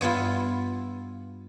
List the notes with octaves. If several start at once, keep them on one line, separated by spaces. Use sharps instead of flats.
G2 B3 E4 F4